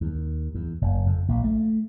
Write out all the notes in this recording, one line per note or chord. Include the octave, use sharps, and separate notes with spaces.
D#2
E2
F#1
F2
A#1
A3